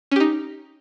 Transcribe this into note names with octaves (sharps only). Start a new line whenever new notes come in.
C#4 D#4 G4